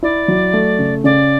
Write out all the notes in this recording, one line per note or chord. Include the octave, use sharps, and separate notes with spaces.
E4 D5
F#3
A3
C#3
C#3 D5